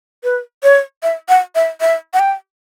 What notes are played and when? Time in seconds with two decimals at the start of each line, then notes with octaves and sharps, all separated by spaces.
0.24 B4
0.63 C#5
1.03 E5
1.29 F#5
1.55 E5
1.81 E5
2.14 F#5
2.19 G5